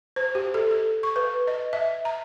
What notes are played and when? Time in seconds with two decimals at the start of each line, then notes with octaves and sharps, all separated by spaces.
0.16 C5
0.35 G4
0.54 A4
0.71 A4
1.03 C#6
1.16 B4
1.47 D#5
1.73 E5
2.05 A#5